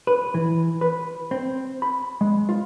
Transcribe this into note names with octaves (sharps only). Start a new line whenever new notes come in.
B4
E3
B4
C4
B5
G#3
F4